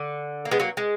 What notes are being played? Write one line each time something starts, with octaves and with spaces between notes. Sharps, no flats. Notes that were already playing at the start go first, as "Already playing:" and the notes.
Already playing: D3
A#3
G#3 B3
F#3 A#3
G#3